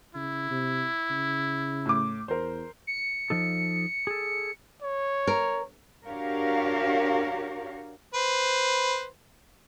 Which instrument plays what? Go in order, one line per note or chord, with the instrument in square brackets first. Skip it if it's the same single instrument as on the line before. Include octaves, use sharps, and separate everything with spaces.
[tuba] C#3 [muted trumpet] E4
[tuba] C3
C#3
[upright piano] A2 D6
[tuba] E2 [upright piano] A#4 C5
[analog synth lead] C#7
[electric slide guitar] F3 D#4 A4
G#4 A4
[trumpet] C#5
[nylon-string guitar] A#4
[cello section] D4 F#4 G4 A#4 C#5 F5
[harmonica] B4 C5